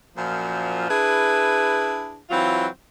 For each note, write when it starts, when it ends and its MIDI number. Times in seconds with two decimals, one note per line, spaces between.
0.17 0.85 42
0.17 0.85 46
0.17 0.85 53
0.89 2.18 62
0.89 2.18 64
0.89 2.18 68
0.89 2.18 71
2.30 2.67 52
2.30 2.67 54
2.30 2.67 60
2.30 2.67 65